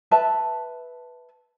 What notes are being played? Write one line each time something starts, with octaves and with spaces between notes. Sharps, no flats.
B4 E5 A5